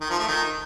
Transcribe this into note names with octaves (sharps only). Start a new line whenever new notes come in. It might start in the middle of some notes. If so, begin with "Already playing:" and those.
D#3
F3
A3
D#3